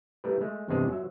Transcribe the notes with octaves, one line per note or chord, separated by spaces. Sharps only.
G3 A3 E4 A#4 B4
G#3 A3
E2 G2 C3 G#3 G#4 A5
F#3 E5